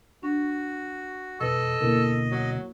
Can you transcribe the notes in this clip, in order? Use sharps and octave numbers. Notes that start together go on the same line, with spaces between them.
D4 F#4
E1 F2 A4 B4 D#5 E6
D2 B2 A#3 E4 A#4
F#3